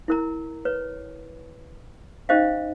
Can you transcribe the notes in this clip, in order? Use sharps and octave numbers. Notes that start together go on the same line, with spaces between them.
E4 A#4 A#5
B4 C#5
C#4 D#4 G4 C5 D#5 F5